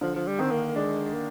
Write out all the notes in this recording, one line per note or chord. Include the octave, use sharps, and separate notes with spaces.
D3 F3
F3
G3
D#3 C4
A#3
G#3 D4
A#3